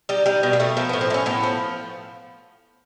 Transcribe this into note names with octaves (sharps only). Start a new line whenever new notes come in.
G3 D#4
G3 D#4
B2
A#3
B2 A3
F3 A#3
B3
A2
C4
A3
C#4
A2 B3
F3